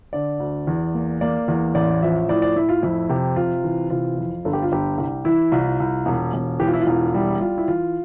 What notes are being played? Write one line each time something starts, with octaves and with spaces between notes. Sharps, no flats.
D3 D5
D2
E2
A#3
A#3 D5
E2
A1 D5
F3 E5
A2 D5
D5
A2 E4
F4
F2 E4
C3 G4
C3 F4
E3
C3 F4
F2
G1 A4
G4
F4
G1 G4
C2 G4
E3 E4
C2 F4
C2
E1
E1
E3 G4
F4
E4
F4
E1
G3 E4
G3 F4
E4
E3 F4